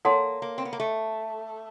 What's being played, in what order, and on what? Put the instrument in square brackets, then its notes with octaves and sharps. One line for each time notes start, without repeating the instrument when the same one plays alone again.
[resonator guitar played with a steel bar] A#3 [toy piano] A4 C#5 F#5 A5 C6
[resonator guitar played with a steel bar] A#3
C4
B3
A#3
A3